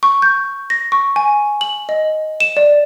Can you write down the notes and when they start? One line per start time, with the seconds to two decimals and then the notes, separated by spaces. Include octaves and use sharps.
0.03 C#6
0.22 G6
0.70 A#6
0.92 C#6
1.16 G#5
1.61 F#7
1.89 D#5
2.40 E7
2.57 D5